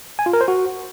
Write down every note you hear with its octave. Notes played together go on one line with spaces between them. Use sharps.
G#5
F4
A#4
C5
F#4